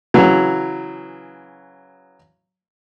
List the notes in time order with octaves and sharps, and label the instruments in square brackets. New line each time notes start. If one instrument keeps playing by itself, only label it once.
[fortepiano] C#3 E3 F#3